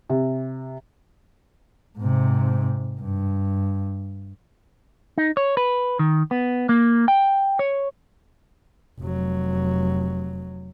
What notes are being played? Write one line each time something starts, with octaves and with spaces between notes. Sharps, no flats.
C3
G#2 C3
G2
D#4
C#5
B4
D#3
B3
A#3
G5
C#5
F1 F#3